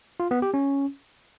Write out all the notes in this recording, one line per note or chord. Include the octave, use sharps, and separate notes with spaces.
F4
B3
G4
C#4